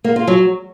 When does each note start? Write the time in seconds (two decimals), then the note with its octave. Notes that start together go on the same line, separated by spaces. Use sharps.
0.04 A#3
0.16 F4
0.27 F#3